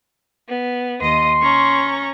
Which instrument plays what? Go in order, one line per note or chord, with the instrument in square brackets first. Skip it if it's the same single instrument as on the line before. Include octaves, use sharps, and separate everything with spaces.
[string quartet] B3
[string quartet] D#2 D#5 D#6 [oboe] C6
[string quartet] C#4 A#5 C#6